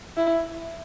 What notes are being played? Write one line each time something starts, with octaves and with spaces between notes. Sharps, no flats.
E4